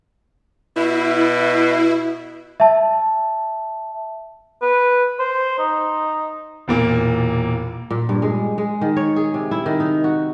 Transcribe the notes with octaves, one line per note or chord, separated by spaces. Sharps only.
B2 E4
E5 A5
B4
C5
D#4
E1 A#2 A#3
A#2
G2
G#3
G#3
D#3
C#5
G#4
C3
E4
D#3
D#4
F#4